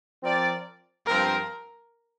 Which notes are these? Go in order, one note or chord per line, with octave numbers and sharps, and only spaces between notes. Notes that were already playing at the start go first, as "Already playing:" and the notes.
F3 C4 A#4 D5
G2 F3 C4 A#4